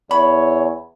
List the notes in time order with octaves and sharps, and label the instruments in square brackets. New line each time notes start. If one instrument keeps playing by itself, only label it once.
[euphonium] E2 [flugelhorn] C#5 [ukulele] B5